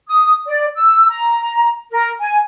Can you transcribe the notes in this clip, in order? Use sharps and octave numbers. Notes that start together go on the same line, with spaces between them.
D#6
D5
E6
A#5
A#4
G#5